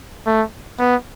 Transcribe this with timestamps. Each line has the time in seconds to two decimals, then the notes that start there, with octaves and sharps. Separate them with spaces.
0.27 A3
0.79 B3